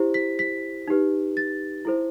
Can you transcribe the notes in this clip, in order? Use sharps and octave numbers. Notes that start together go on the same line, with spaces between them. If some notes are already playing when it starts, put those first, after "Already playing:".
Already playing: E4 G4 C5
B6
B6
D#4 G4 B4
A6
E4 A4 C5